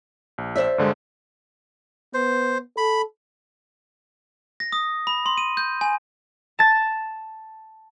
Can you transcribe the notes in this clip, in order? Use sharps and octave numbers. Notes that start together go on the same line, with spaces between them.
A#1
C5 D5 E5
G2 D3 G#3
B3 C5
A4 B5
A#6
D#6
B5
C6
D#7
G6
G#5
A5 A6